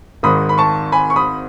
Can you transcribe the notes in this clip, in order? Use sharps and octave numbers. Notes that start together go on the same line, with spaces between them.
G#1 G#2 D#3 B5 D#6
B5
A5 C#6
G#5 B5
C#6
B5 D#6